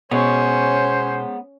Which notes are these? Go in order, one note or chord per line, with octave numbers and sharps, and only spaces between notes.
B2 G#3 B3 C#4 C5 C#5